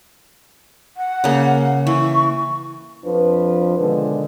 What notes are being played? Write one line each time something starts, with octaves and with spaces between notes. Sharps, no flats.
F#5
C#3 A#3
E3 C#6
F2 F3 D4 B4
B2 D3 D#3 F3 G#3